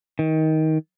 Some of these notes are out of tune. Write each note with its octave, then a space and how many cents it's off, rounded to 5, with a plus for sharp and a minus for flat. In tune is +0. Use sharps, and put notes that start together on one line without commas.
D#3 +20